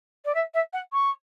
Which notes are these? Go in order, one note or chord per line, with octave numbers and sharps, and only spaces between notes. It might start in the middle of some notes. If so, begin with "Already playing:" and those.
D5
E5
E5
F#5
C#6